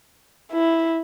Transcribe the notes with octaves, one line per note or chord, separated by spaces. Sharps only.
E4